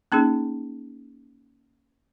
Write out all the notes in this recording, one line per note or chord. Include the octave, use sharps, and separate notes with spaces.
A#3 C#4 D#4 G#4